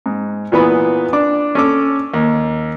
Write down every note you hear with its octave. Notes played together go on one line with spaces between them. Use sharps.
G#2
A#2 E3 B3 B5 D#6
D4 D6
C#4 A4 D6
D#2